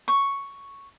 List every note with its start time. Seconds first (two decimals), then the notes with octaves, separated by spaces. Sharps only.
0.08 C#6